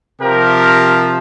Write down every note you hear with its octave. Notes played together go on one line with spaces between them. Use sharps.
C3 F3 G4 A#4